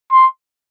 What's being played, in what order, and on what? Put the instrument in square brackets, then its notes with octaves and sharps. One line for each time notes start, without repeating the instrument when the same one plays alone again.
[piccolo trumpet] C6